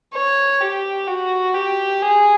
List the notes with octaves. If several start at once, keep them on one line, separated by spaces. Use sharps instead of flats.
C#5
G4
F#4
G4
G#4